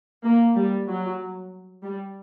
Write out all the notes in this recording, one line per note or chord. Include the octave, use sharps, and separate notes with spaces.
A#3
G3
F#3
G3